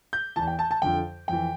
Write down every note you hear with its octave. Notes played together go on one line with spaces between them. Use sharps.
G6
E2 E3 A5
G5
A5
A5
F2 D3 F3 G5
F2 E3 G5